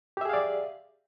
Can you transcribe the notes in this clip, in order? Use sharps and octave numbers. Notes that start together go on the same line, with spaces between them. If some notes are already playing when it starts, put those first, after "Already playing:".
G4 G#4 D5 E5 F5